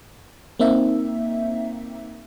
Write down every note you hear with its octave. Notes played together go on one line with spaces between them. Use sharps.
A#3 C4 D#4 E5